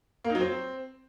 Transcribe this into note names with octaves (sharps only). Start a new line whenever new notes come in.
A#3
D#4
F#3
C4